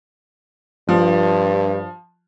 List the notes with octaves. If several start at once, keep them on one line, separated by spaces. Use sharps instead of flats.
G2 F3